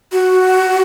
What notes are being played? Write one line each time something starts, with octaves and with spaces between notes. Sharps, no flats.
F#4